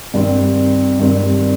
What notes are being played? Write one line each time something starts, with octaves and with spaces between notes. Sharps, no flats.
G2 D#3 G3 C4
G2 D#3 G3 C4